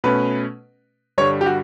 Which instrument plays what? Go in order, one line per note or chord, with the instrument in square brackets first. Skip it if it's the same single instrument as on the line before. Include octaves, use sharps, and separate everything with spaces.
[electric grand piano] B2 A3 C#4 [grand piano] B4
[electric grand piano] G2 D3 G3 [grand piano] C#5
[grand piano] G4
F#4